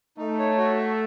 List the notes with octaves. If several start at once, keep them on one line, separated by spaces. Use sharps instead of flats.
A3 D#4
C#5
F#4
E5